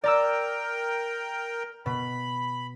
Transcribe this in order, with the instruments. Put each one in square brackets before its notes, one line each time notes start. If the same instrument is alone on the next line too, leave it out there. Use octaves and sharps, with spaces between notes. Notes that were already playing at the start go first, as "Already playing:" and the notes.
[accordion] A#4 G5 [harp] D5 A#5 E6
[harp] B2 [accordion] B5